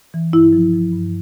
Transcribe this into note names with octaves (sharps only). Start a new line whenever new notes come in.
E3
G2 E4
F3
F3
G2